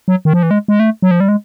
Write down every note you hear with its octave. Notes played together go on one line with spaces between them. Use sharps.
F#3
D#3
F3
E3
G#3
G#3
A3
F#3
F3
G3
G#3